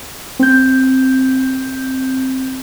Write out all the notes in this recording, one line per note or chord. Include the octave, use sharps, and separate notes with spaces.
C4 G6